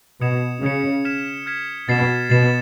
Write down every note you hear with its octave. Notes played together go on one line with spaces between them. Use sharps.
B2 D#6 G#6 C#7 E7
C#3 D#6 G#6 C#7 E7
F6 G#6 B6 E7
F6 G#6 B6 E7
B2 A6 C7 E7
B2 A6 C7 E7